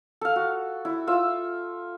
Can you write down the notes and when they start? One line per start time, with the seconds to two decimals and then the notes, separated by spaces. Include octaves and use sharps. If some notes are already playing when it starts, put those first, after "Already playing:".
0.21 A4 F5
0.36 F#4
0.85 E4
1.07 F4 E5 E6